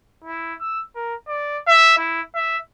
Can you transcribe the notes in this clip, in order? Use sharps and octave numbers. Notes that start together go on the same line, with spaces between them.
E4
E6
A#4
D5
E5
E4
E5